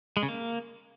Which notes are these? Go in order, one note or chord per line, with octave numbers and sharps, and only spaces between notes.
G#3
C#3
A#3